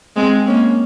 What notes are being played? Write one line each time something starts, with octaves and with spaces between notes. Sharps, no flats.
G#3 C4
A#3 C#4